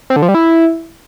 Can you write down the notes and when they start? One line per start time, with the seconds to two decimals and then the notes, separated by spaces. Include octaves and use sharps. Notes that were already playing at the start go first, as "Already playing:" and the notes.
0.10 C4
0.16 D3
0.22 F3
0.28 G3
0.35 E4